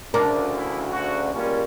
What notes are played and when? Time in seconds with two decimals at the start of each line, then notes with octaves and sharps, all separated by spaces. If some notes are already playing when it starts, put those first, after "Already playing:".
0.14 D2 C#3 D4 A#4
0.55 E4
0.88 F#4
1.33 C#2 G3 A#3 C#4